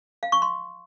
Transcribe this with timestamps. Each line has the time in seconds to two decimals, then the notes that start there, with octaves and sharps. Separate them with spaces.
0.23 F5
0.32 C#6
0.42 C6